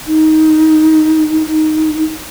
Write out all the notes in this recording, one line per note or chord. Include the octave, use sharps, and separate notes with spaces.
D#4
D#4